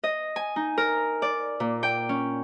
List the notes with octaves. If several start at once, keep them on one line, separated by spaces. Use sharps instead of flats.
D#5
G#5
D#4
A#4
D5
A#2
G5
C#4